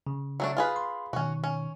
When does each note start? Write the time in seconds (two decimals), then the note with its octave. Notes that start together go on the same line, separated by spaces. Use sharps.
0.07 C#3
0.40 F#3 A3 D4
0.57 F4 G#4 B4
0.76 C6
1.13 B2 D#3 C#4 F#4
1.44 C#4